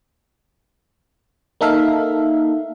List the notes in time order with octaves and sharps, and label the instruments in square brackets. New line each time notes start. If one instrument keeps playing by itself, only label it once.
[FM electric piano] A#3 D#4 A4 E5 F5